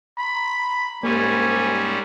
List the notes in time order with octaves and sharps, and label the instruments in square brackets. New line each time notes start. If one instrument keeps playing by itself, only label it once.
[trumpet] B5
[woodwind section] C2 G#5 [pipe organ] G#2 G3 C#4 [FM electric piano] A#3 [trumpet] D5